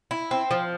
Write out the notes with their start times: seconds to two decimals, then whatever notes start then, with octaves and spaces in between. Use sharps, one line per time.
0.11 E4
0.31 C4
0.51 F3